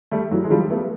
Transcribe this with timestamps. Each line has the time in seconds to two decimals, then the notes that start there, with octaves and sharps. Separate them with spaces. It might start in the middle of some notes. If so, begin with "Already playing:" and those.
0.11 G3 A3
0.31 E3 F#3
0.44 G#3
0.50 F3 G3
0.70 A3 B3